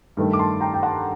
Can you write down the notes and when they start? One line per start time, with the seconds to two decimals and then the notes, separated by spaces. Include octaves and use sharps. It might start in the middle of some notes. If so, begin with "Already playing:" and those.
0.17 G2 D#3 A3
0.33 D6
0.39 A5 C6
0.61 G5 A#5
0.74 G5
0.83 F#5 A5